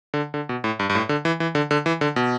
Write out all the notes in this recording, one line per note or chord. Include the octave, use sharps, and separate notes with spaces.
D3
D3
B2
A2
G2
G2
A2
D3
E3
E3
D3
D3
E3
D3
B2